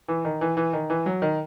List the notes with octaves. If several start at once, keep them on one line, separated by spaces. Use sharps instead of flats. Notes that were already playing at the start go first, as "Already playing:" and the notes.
E3
D#3
E3
E3
D#3
E3
F#3
D#3